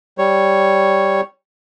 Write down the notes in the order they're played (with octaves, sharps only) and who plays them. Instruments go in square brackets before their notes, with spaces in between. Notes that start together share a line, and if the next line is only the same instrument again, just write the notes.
[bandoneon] G3 C#5